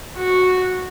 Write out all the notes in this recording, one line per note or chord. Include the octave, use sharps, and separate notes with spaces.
F#4